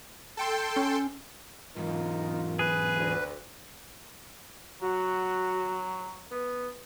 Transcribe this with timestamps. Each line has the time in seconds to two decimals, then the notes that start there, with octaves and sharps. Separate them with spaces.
0.37 A4 G5 C6
0.76 C#4
1.76 E2 G#2 D#4 F4 A#4
2.59 G#4 B4
2.96 D2
4.82 F#3 F#4
6.31 B3